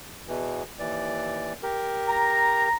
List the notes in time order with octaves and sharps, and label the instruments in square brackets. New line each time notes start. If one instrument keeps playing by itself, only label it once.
[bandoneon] E2 B2 E3
D#2 E3 D5
G4 A#4
[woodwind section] A#5